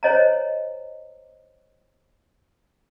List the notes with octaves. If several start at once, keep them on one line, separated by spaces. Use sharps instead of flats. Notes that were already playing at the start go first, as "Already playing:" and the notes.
C5 C#5 D#5 G#5 A#5